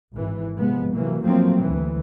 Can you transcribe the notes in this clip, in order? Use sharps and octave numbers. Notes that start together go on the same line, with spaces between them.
G#1 E3
C3 F3 G#3 B3
C3 E3 F#3 A#3
F3 F#3 A3 A#3 C4
D2 E3